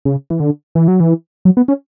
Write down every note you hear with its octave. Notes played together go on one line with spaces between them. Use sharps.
C#3
E3
D3
E3
F#3
E3
F#3
B3
C#4